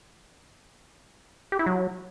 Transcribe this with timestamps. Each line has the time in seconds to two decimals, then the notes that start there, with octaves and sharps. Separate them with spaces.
1.52 G4
1.59 E4
1.66 F#3